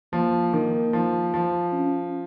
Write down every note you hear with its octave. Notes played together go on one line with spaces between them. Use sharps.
F3 A#3
D#3
F3
F3
C#4